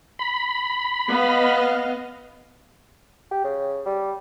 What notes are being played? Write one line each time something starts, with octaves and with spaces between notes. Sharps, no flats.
B5
B3 D#5 F5
G4
C#3
G3